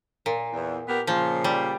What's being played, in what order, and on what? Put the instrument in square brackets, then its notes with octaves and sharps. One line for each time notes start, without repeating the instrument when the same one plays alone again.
[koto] A#2
[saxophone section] E2
B3 G4 A#4
[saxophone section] A#2 C#3 [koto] F3
[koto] G3